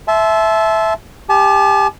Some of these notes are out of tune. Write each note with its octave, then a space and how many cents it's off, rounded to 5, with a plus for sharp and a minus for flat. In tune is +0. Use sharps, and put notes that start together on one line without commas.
E5 +0 A5 -30 C6 +0
G4 +20 A5 -40